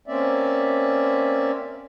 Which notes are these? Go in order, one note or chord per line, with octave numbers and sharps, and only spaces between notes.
A#3 C4 C#4 D5 E5